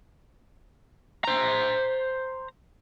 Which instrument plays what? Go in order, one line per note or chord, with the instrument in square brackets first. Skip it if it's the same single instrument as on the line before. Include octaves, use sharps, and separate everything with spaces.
[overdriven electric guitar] C5 A#5